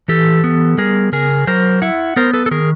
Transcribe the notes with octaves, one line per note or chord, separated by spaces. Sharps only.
E3 G4 A4
B3
G3 G#4 A#4
C#3 G#4 A#4
F#3 A#4 C5
E4 E5 F#5
B3 A#4 C5
A4 B4
A4
D#3 G#4 A#4